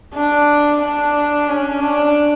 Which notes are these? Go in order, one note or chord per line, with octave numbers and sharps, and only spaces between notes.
D4
D4
C#4
D4